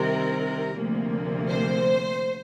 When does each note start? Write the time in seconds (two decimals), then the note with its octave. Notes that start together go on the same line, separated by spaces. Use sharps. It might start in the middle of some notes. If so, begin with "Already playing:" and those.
Already playing: C2 C3 D#3 A#4
0.75 D2 C3 F3 A#3
1.49 C5